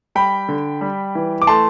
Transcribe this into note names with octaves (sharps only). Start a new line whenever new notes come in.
G3 G5 B5
D3
G3
E3
D6
A3 A5 C6